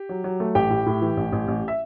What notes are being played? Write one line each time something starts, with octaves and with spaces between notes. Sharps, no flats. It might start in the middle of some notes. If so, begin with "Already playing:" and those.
Already playing: G4
F#3
F#3
A3
A1 G4 G5
A2
A2
E3
A1
A1
A1
E5